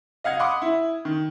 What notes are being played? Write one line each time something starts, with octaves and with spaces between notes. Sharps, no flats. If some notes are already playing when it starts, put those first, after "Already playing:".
D#5 F5 F#5 G#6
F#5 B5 C6 D6 D#6
E4
D#3